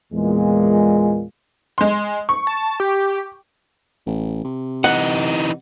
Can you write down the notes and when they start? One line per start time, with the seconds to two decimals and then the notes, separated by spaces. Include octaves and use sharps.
0.13 E2 A#2 G#3
1.78 G#3 C6
2.29 C#6
2.47 A5
2.80 G4
4.06 A1
4.44 C3
4.84 E3 D#4 F#5